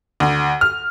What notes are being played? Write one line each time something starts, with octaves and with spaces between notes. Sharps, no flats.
D2
F6